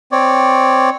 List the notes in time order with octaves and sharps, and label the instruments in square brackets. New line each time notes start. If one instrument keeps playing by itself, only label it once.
[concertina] C4 C#5 D5